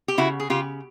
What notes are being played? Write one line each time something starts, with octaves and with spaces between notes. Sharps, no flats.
G4
C#3 E4 F#4
G#4
C#3 F4 G4